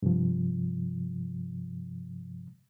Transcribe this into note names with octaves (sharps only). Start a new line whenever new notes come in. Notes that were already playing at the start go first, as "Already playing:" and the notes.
G2 C3 F3